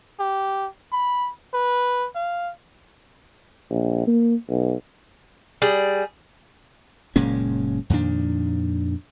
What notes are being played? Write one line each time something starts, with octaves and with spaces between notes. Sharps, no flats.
G4
B5
B4
F5
A#1
A#3
B1
G3 G#4
F#1 A#2 G#3 C#4
F2 A#2 D#3 D4